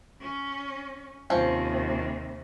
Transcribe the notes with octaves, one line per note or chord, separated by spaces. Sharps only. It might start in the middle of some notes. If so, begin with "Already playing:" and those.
C#4
D#2 C3 F3 C#4